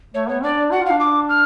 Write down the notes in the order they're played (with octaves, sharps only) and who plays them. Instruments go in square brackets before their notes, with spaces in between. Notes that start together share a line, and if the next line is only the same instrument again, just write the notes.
[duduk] A3 [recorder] C#5
[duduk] B3 [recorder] C#5
[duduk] D4 [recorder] D5
[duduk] F#4 [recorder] F#5
[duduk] F4
[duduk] D4 [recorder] F5
[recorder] D6
F6